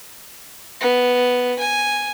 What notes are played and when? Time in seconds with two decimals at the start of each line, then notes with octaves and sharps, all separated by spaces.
0.81 B3
1.59 G#5